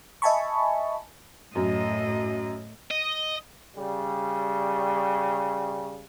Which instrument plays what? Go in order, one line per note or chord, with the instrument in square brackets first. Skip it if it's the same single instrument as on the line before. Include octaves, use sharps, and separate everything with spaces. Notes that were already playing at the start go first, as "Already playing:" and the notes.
[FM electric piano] D#5 E5 G#5 A5 B5 C#6
[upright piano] F#2 [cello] A2 D#5
[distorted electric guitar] D#5
[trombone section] C#3 G3